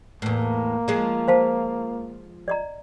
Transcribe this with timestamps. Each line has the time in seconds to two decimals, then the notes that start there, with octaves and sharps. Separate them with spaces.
0.22 E2 A2 A#3
0.88 F3 G#3
1.28 C5 F5 A5
2.48 D5 D#5 A#5